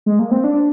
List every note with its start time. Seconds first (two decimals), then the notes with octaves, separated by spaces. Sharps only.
0.06 G#3
0.19 A#3
0.31 C4
0.44 D4